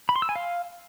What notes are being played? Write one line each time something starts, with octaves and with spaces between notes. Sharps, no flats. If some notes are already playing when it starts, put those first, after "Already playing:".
B5
C6
E6
G#5
F5